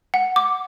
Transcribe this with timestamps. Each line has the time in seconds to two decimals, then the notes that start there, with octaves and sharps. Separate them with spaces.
0.14 F#5
0.36 D6